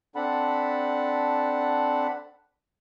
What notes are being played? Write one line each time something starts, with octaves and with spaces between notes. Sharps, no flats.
C4 D4 A4 F#5 A5 B5